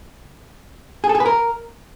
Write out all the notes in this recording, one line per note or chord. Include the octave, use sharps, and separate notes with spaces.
G#4
A4
G#4
B4
A#4